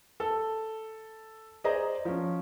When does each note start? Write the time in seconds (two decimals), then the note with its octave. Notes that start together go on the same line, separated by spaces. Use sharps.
0.20 A4
1.64 G#4 C5 D5 D#5 A#5
2.05 F3 C#4